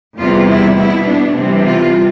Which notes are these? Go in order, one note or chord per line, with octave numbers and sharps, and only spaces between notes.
E2 C3 G3 B3 F4
E4
B2 B3 E4
D4
C3 E3 G3 C4
F4